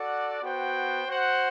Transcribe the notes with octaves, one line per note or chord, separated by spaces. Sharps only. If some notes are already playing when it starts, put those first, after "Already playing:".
Already playing: F#4 A4 D5 F#5
B3 F#4 C5 G5
F#4 C5 F#5